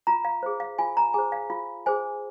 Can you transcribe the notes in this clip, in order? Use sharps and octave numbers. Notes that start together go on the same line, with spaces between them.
F4 A#5
F5
G#4 C5
F5
F4 G#5
A#5
G#4 C5 G#5
F5
F4 F5
G#4 C5 G#5